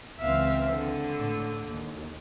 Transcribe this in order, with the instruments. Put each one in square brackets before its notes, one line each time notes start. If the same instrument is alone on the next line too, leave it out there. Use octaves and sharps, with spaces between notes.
[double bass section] C#2 E3 C4 [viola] E5 F5
[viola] D3
[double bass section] A2
D#2